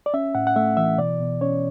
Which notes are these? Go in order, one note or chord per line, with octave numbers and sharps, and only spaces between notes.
D5
C#4 E5
A2 F#5
F#5
A3 E5
E3 E5
B2 D5
B2
C#4 C#5